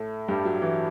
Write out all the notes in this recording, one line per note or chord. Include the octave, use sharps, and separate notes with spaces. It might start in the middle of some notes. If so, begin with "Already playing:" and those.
Already playing: A2 A3
G2 G3
F#3
E3